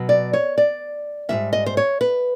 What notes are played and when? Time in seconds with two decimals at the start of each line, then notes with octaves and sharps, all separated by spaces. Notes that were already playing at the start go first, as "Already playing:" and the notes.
Already playing: B2 F#3
0.09 D5
0.33 C#5
0.58 D5
1.29 G#2 D#3 G3 E5
1.53 D#5
1.66 C5
1.77 C#5
2.01 B4